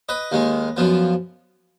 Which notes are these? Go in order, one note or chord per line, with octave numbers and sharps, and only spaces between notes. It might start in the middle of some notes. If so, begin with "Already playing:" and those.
B4 D#5
D#2 D#3 G#3
F#2 F3 B3